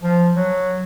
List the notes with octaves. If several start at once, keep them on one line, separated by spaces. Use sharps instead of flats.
F3
F#3